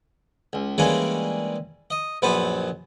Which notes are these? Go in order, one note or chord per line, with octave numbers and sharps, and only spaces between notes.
C#2
E3 G3 G#3 A#3 C#4 D4
D#5
A#1 F#2 B3 B4 C5 A5